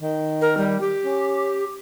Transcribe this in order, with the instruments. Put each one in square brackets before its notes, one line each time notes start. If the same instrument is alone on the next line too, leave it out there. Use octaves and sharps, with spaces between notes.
[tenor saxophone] D#3
[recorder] A#4
G3
G4
[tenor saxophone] C#4